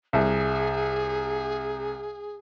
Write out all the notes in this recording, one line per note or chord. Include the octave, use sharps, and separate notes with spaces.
C2 G#4